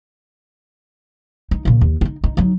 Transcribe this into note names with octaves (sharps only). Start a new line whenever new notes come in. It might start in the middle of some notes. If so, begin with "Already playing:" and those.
D#4
A#2 C#3
D#2
C#4 D#4
D#4
F#3 D#4